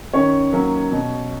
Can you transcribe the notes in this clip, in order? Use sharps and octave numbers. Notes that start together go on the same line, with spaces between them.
D#3 C#4 C#5
F#3 A#3 C#4
B2